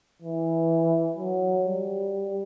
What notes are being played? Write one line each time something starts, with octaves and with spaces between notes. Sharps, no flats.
E3
F#3
G3